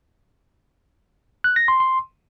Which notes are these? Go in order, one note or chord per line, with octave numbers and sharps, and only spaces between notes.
F#6
A#6
C6
C6